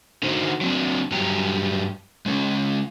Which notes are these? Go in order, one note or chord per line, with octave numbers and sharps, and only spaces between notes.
D3 D#4 F#4 C5
F#3 C4 D4
G2 F#3 G4 A#5
G#3 C#4